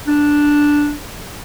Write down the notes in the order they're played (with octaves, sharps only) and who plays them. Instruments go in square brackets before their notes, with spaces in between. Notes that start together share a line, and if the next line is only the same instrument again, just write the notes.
[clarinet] D4